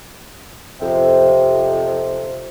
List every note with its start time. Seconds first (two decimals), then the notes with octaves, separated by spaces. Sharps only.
0.80 F2 C3